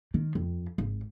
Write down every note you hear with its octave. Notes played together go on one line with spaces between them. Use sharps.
D#3
F2
G#1